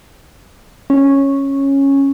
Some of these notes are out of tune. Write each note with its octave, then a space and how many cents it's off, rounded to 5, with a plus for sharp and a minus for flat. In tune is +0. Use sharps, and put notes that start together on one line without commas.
C#4 -10